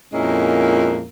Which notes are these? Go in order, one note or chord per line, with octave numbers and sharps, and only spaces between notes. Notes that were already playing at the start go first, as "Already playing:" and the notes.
F2 A#2 G#3 A#3 C#4 E4